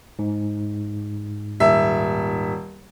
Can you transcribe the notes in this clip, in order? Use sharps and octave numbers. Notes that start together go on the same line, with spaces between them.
G#2
D#1 E5